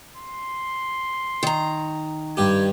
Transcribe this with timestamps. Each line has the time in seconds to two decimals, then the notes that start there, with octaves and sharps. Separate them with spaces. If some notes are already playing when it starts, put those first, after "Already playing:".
0.16 C6
1.43 D#3 A#5
2.37 G2 G4 G#6